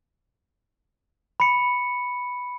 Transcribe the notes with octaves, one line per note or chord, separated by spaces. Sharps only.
B5 C#7